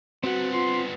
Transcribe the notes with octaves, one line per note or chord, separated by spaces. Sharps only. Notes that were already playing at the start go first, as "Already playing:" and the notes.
G3 B3 C4 F#4 F#5
F4 C6